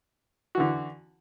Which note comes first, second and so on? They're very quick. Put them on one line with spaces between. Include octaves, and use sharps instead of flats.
F#4 E3 D3